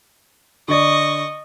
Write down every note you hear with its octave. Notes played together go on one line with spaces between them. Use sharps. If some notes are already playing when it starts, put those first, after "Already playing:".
D3 D5 D#5 C#6